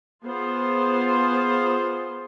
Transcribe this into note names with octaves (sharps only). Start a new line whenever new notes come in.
B3 F4 G#4 C5